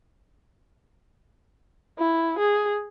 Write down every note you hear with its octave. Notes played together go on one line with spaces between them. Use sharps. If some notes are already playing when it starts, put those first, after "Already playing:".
E4
G#4